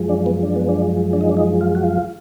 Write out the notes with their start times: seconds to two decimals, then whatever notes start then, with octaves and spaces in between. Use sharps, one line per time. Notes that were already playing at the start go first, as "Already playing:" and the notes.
Already playing: F#2 F3 G#3
0.09 D4
0.26 B3
0.43 D4
0.56 B3
0.69 D4
1.13 D4
1.21 D#4
1.29 D4
1.37 D#4
1.61 F4
1.75 F#4
1.84 F4